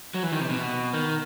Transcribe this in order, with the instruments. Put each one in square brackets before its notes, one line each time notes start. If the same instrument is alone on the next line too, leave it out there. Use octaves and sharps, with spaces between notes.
[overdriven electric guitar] F#3
E3
D#3
C3
B2
D#3